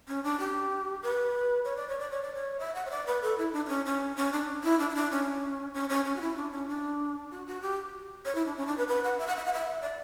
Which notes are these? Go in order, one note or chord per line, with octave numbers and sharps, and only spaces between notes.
C#4
D4
G4
B4
C#5
D5
C#5
D5
C#5
D5
C#5
E5
F#5
C#5
D5
B4
A4
E4
D4
D4
C#4
C#4
C#4
D4
E4
D4
E4
D4
C#4
C#4
C#4
C#4
F#4
E4
D4
C#4
D4
F#4
F#4
G4
C#5
E4
D4
C#4
D4
B4
B4
F#5
E5
F#5
E5
F#5
E5
D5